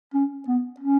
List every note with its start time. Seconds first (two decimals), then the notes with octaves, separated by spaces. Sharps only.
0.14 C#4
0.47 B3
0.80 C#4